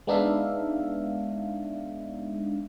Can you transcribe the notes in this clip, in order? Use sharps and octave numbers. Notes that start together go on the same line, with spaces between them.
G#3 B3 D4 D#4 E5 F5